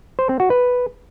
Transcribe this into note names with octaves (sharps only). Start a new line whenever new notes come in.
C5
C4
F#4
B4